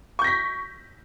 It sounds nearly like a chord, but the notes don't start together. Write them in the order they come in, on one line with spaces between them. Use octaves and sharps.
C#6 G6 A#6 B6